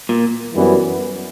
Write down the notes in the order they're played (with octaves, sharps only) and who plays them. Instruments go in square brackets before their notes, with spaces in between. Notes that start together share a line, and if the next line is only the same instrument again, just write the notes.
[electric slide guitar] A#2
[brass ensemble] F#2 E3 G3 B3